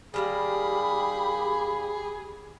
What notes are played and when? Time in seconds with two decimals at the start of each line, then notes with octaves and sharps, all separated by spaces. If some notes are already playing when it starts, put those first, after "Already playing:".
0.14 D#3 G3 A#3 G4 G#4 B5